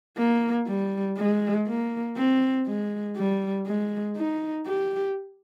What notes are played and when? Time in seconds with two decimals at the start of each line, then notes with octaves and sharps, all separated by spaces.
0.18 A#3
0.68 G3
1.17 G#3
1.67 A#3
2.17 C4
2.67 G#3
3.17 G3
3.67 G#3
4.17 D#4
4.67 G4